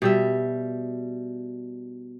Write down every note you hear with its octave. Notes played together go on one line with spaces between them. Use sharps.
B2 G3 E5